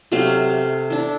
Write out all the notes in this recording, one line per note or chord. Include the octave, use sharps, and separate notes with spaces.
C3 F#3 A3 F5
F5
D4 E4